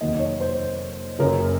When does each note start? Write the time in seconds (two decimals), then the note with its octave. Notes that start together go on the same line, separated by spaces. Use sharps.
0.01 F1 D#2 D#3 F#3 D#5
0.19 C#5
0.40 C5
1.19 F#1 F#2 C#3 A#4